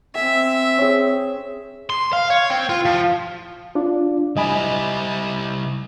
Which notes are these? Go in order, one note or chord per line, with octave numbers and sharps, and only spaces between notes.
C4 E5 G#5
C#4 G#4
C6
F5
C#5
C4
F4
F3
D4 F4 D5
G3 E4 D#5 G#5 B5